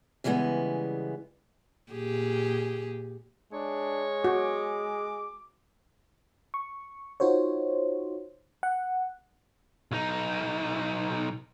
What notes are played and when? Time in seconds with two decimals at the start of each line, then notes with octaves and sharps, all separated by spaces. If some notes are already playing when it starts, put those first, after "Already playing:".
0.24 C#3 E3 G3 G#3 B3
1.92 A#2 G4 G#4
3.53 G#3 D4 C#5
4.24 F#4 D6
6.54 C#6
7.20 D#4 F4 F#4 C5 C#5
8.63 F#5
9.91 B1 D#4